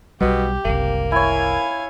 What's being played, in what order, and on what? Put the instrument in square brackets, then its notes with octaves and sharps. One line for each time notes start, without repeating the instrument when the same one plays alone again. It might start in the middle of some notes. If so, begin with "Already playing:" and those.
[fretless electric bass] B1 G3 [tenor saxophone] B2 [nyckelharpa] G4
[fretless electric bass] F#1 C2 [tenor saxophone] A#3
[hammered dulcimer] E4 C#5 [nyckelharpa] F5 G#5